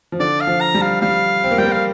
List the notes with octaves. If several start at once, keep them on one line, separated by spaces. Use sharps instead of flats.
F3
D3 D5
F5
F3
A#5
G3
F5
G3 F5
C4
A#3
G3 G5
A#3
F5